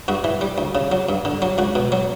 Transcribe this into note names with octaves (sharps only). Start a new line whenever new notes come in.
G2 F#4
E3
G3
D2
C#3
F#3
G2
D3
F#3
C#2 F#4
B2
F#3